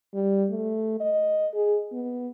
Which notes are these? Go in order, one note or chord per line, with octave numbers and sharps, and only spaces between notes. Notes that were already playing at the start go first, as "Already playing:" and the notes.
G3
A3
D#5
G#4
B3